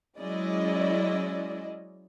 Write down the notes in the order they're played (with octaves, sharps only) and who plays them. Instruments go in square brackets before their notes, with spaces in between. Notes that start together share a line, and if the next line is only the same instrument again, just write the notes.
[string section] F#3 G#3 C#4 E4 D5 D#5